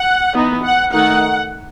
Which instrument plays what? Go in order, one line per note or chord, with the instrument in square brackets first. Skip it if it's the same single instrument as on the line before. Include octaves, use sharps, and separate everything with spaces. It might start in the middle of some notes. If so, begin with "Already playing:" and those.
Already playing: [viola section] F#5
E3 B3 D#4
F#5
D#3 A3 D#4 F#5